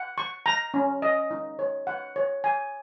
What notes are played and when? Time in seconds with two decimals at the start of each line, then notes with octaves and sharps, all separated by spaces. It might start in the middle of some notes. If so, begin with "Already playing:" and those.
Already playing: F#5
0.18 C#6
0.46 A#5
0.74 C#4
1.02 D#5
1.31 D#4
1.59 C#5
1.87 F#5
2.16 C#5
2.44 G#5